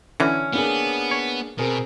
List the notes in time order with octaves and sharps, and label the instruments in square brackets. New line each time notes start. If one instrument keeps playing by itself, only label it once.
[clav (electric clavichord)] D3 E3 [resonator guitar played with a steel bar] C#4
[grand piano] A#3 D4 G#4 [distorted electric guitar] B3
[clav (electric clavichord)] C#5
[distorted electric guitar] B2 [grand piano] C4 G#4 A#4